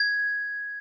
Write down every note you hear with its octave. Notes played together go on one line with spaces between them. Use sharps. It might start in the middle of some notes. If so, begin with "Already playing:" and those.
Already playing: G#6